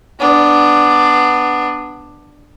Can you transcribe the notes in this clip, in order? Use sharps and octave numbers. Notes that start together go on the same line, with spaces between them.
B3 D4